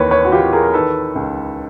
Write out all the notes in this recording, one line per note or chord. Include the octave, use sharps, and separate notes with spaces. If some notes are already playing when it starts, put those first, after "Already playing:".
Already playing: D#2 E3 B4 C#5
B4 C#5
F#4
E3 F4 G4
G#4 A#4
A#4
D#3 A4 B4
C#2